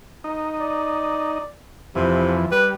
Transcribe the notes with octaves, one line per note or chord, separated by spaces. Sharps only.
D#4
D5
F2 C3 E3
G3 B4